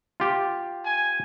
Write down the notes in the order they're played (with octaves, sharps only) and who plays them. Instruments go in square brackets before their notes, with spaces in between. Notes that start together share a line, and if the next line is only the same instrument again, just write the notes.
[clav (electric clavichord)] F4 G4
[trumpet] G#5